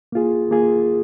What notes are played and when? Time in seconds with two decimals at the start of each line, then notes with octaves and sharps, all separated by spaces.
0.12 A#3 F4 G#4
0.51 A#3 F4 G#4